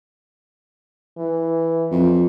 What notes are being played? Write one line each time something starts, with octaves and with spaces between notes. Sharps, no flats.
E3
F2